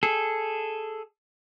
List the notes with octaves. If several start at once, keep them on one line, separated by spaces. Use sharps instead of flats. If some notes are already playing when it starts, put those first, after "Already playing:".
G#4 A4